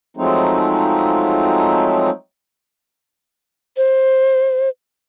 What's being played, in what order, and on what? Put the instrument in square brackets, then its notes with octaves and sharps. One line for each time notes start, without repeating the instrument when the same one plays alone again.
[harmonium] F3 F#3 G#3 A3 C4 D#4
[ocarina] C5